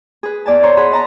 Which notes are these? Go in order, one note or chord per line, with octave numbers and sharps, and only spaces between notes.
G#4 B4
E2 D5 G#5 A5
C5 C#5 A#5 C6
G#4 F#5 B5 C6
D#5 A5 A#5